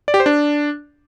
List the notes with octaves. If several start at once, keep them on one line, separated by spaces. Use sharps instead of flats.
D5
G4
C5
D4